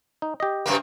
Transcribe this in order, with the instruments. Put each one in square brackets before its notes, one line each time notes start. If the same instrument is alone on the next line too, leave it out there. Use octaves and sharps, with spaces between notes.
[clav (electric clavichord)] D#4
G4 D#5
[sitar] F#2 C3 A#3